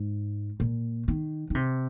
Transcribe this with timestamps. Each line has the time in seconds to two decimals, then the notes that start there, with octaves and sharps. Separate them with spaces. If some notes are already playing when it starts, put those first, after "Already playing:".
Already playing: G#2
0.60 A#2
1.08 D#3
1.50 D#3
1.55 C3